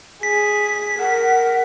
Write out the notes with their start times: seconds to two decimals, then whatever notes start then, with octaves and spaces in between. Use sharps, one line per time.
0.23 G#4 B6
0.99 A#4 F#5